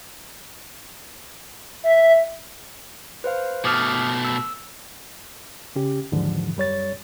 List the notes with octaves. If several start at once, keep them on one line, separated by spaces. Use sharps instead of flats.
E5
B4 C5 F5
B2 A3 D6 D#6 F6
E6
C#3 C#4 G4
D#2 G#2 D3 E3 F3
F#2 G3 C#5 A6